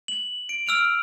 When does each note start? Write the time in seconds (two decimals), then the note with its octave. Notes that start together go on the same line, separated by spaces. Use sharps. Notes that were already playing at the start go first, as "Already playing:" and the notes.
0.08 F#7
0.49 D7
0.67 E6 F6 D7 F7